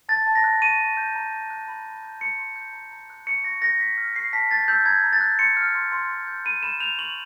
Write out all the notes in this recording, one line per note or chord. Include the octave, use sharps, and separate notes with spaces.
A5 A6
A5
A#6
F#6
C#6 D#7
C#6
G6
A#5
A#5
F#6
B5
B5
G6
C6 C#7
C6
G6
A#5
A#5
F#6
C#6 C#7
C#6 A#6
G6 A#6
C#6 B6
F6
C#6 C7
A5 B6
G6 A6
E6 G6
A#5 G#6
A#5
A6
F#6
C6 C#7
F6
C6
C6
C6
G6
B5 D#7
B5 E7
G6 F7
C#6 F#7